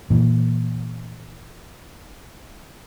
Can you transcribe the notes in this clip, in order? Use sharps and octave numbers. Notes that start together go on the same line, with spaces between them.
A#2 E3